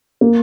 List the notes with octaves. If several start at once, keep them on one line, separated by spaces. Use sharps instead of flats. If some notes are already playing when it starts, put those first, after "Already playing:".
A#3